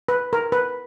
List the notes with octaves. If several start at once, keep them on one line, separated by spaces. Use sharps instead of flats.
B4
A#4
B4